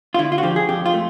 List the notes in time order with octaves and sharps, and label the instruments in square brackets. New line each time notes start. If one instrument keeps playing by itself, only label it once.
[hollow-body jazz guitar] F4
D3 E4
F4
F#4
F3 G4
G#4
F2 G4
F4
A3